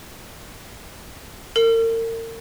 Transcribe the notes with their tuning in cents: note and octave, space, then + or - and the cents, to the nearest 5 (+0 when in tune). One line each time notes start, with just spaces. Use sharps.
A#4 -40